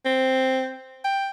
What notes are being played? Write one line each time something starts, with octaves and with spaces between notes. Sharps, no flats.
C4
G5